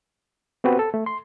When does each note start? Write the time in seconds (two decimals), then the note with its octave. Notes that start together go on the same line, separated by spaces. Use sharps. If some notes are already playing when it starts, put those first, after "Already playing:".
0.64 B3 C4 F#4 G4 B4
0.79 A4
0.94 A3
1.06 C6